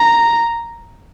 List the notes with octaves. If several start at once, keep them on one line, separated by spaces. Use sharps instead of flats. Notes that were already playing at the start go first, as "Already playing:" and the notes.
Already playing: A#5